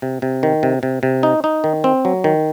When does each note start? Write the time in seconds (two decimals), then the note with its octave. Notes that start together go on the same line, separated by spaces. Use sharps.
0.02 C3
0.22 C3
0.43 D#3
0.63 C3
0.83 C3
1.03 C3
1.23 D#4
1.44 D#4
1.64 D#3
1.84 C4
2.05 F#3
2.24 D#3